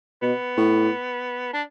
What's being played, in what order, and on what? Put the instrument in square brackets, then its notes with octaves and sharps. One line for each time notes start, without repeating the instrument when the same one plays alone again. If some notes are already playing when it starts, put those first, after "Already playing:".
[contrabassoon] B2 [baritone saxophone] B3
[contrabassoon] A2
[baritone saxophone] D4